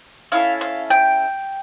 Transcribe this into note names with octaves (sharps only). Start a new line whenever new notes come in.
C#4 E4 A4 F5
F5
G5